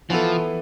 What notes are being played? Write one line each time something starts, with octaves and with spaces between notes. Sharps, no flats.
E3 F3 B3 E4 A4